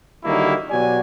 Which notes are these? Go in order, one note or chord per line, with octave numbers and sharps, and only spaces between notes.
D3 D#3 F#3 G3 A#3 E4
B2 F#3 G4 D5 G#5